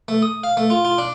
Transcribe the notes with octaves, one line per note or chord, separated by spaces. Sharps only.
A3
D#6
F5
A3
F4
F4
D4